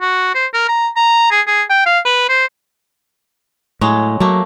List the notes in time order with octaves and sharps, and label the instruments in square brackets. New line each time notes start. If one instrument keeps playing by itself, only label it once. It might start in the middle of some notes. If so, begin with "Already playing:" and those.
[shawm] F#4
C5
A#4
A#5
A#5
G#4
G#4
G5
F5
B4
C5
[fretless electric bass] A2 [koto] F#3 G#3
[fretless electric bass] F#3 [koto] A3 A#3